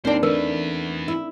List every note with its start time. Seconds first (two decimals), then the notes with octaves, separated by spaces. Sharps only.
0.05 D#2 C4 D4 D#4 A#4 C5 G5
0.23 E3 A3 B3 D4 A#4 B4 E6
1.08 E4